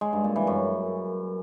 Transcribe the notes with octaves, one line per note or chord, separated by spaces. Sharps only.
G#3
G2
A#2
E3
F#2